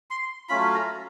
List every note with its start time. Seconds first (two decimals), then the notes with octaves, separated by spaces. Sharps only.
0.11 C6
0.49 F#3 A3 C#4 F4 B5
0.75 A#5